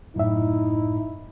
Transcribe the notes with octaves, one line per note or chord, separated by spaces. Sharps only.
F#2 A2 D#4 E4 E5